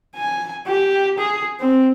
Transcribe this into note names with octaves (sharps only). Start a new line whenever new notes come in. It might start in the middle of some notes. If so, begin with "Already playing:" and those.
G#5
G4
G#4
C4